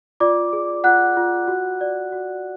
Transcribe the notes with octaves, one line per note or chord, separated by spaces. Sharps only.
F4 D5 D6
G#4
F4 F#5 F#6
F4
F#4
D5
F#4